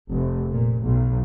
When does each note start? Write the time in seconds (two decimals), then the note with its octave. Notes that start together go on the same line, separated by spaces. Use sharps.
0.11 F1
0.51 A#2
0.83 B1